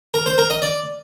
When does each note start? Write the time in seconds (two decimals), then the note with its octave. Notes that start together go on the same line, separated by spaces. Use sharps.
0.14 A#4
0.26 C5
0.38 A#4
0.50 D#5
0.62 D5